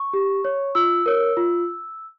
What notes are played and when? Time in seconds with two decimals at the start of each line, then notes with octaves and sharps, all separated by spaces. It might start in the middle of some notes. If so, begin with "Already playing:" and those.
Already playing: C#6
0.13 G4
0.45 C#5
0.75 F4 E6
1.06 A#4 C#5
1.37 F4